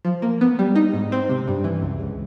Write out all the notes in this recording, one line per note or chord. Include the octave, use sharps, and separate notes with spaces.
F3
A#3
B3
G3
D#4
G#2
C4
C3
G2
E3
C#2
C#2